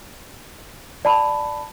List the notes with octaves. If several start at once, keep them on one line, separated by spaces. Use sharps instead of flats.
D5 A5 B5